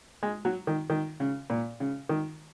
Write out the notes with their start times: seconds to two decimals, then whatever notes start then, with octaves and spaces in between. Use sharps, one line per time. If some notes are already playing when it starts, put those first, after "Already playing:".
0.23 G#3
0.45 F#3
0.67 D#3
0.90 D#3
1.20 C#3
1.50 A#2
1.80 C#3
2.09 D#3